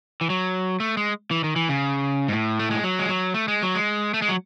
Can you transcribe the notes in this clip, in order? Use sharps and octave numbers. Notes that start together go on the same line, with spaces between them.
E3
F#3
A3
G#3
E3
D#3
E3
C#3
G#2
A2
A3
G#3
F#3
G#3
F#3
A3
G#3
F#3
G#3
A3
G#3
F#3